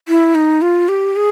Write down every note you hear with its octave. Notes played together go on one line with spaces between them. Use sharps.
E4
D#4
F4
G4
G#4